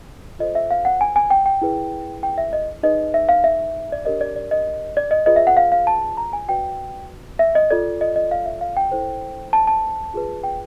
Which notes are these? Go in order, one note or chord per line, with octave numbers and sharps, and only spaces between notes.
F4 A4 C5 D#5
E5
F5
F#5
G#5
G#5
G5
G5
E4 G#4 B4
G5
E5
D#5
D#4 G#4 B4 D5 D#5
E5
F5
E5
D5
D4 G4 A#4 C#5 D#5
D5
D5
D#5
D5
D#5
F4 G#4 B4 D5 D#5
E5
F#5
F5
F5
A5
A#5
G#5
F#4 B4 D5 G5
E5
D#5
F4 A4 D5
D#5
D#5
F5
E5
F5
G5
E4 A4 C5
A5
A5
F4 G#4 B4
G5